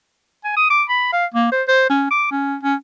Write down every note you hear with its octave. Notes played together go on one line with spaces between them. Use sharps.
G#5
D#6
D6
B5
F5
A#3
C5
C5
C#4
D6
C#4
C#4